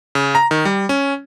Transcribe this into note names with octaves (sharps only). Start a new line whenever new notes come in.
C#3
A#5
D#3
G3
C#4